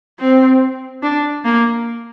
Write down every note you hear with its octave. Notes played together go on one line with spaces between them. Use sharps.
C4
D4
A#3